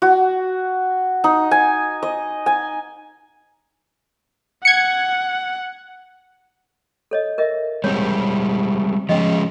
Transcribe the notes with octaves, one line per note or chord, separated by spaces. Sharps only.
F#4
D#4
G#5
D#5
G#5
F#5 G#6 C#7
A4 C#5 D#5
A#4 D#5 E5
G3 G#3 C4 C#5
F3 G#3 C#4 D#5 G5